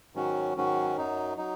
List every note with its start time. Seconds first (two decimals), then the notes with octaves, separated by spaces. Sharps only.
0.14 G#2 D#3 F#3 C#4 F#4
0.56 G#2 D#3 F#3 C#4 F#4
0.96 F#2 F#3 D#4
1.37 F#3 D#4